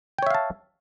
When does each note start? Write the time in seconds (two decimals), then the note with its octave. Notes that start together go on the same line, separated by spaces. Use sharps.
0.18 G5
0.22 C#5
0.26 E5
0.30 F5
0.34 A5